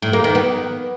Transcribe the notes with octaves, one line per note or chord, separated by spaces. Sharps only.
A2
A#3
D#3
B3